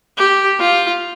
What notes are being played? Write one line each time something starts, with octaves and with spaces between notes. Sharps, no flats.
G4
F4